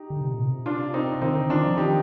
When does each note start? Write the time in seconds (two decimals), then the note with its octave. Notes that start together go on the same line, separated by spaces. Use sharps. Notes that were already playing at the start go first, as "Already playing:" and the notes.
Already playing: D#4 G4
0.10 D3
0.21 C3
0.33 A#2
0.44 C3
0.66 D4 F4
0.94 C4 D#4
1.22 D#3 C4 D#4
1.36 D3
1.50 D#3 D4 F4
1.64 F3
1.77 D#3 D#4 G4